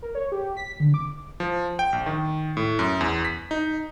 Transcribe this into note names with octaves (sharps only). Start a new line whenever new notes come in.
A#4
C#5
G4
B6
D3
D6
F3
G5
A#1
D#3
A2
F#2
E2
B6
D#4